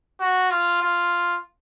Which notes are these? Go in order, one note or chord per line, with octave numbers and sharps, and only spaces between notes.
F#4
F4
F4